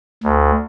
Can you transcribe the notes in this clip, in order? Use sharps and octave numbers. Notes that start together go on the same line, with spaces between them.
D2